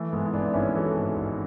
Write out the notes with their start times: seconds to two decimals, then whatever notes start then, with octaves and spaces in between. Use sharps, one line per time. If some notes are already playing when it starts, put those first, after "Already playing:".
Already playing: E3 A3
0.13 G#2 G#3 B3
0.26 E4
0.34 G#1 B3 D4
0.54 G#1 C#4 E4
0.75 E3 F#4 A4
0.96 G#2
1.16 G#1